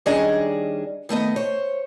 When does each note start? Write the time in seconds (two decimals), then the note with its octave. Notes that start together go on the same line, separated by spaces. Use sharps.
0.06 D#3 G3 C#4 D4 G#4 D#5
1.09 D#3 A3 B3 D#5
1.36 C5 C#5